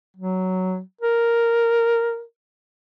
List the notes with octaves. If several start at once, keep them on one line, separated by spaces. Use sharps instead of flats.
F#3
A#4